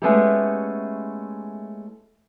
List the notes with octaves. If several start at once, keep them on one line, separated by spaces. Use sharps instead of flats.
G#3 A3 B3 C#4 E4 G4